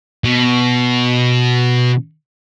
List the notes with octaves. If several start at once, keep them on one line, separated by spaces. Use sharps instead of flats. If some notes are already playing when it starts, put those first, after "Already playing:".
B2